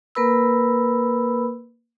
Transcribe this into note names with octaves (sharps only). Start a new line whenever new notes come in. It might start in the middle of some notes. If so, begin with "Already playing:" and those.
A#3 A#4 B4 B5 E6